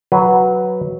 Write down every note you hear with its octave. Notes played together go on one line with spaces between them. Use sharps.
F#3 B4